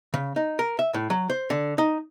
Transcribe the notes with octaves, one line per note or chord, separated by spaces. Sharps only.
C#3
D#4
A#4
E5
A2
F#3
C5
D3
D#4